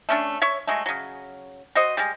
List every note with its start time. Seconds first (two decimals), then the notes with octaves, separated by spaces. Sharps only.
0.09 A3 C#4 D4
0.42 C#5 E5 C#6
0.67 F#3 G#3 A3
0.86 C#3 F#3
1.75 F#4 C5 D#5
1.97 G3 G#3